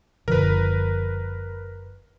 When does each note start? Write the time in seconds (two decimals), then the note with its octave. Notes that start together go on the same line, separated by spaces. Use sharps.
0.28 F#1 D3 F3 A#4 B4